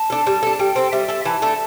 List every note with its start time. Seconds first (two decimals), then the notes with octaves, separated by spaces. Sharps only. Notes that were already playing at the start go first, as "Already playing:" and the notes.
Already playing: A5
0.10 D4 A4
0.27 G3
0.43 D4 A4
0.59 G3 G5
0.76 C4 A4
0.92 G3 E5
1.08 C4 A4
1.25 E3 A5
1.42 A3 D4 A4